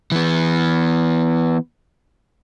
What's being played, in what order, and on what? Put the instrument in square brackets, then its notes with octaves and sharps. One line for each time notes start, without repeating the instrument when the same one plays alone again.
[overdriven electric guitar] E3 B3